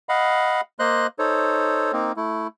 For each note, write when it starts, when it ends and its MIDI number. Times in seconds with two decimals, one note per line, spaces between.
0.09 0.61 75
0.09 0.61 77
0.09 0.61 78
0.09 0.61 83
0.79 1.07 58
0.79 1.07 72
0.79 1.07 75
0.79 1.07 84
0.79 1.07 90
1.19 1.92 63
1.19 1.92 69
1.19 1.92 72
1.19 1.92 73
1.93 2.12 58
1.93 2.12 60
1.93 2.12 63
2.17 2.47 57
2.17 2.47 64